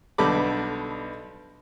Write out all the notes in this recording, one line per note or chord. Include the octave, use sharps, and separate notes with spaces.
B1 D3 G3 A4 B5 D6